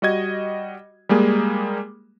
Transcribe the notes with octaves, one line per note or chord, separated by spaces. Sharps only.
G3 F#4 D#5 G#6
G3 G#3 A#3 G#4